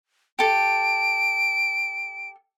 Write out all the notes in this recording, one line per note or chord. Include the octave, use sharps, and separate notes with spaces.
G4 A4 D7